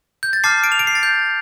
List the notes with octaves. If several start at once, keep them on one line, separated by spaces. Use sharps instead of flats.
G6
A6
A5 D6 F6 C7
D7
F7
D7
C7
A6
G6